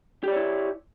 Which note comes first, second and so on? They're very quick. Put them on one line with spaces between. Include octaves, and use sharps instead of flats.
G4 D5 C#5 E4